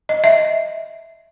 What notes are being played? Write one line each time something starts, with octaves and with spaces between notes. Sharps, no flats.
D#5
E5